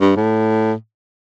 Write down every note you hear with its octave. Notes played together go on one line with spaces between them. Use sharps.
G2
A2